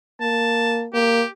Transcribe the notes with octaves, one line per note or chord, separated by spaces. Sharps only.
A#3 A5
A#3 G4